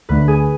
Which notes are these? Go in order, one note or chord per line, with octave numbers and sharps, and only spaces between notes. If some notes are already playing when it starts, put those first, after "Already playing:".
D2 D3 A3 D4 B4
G#4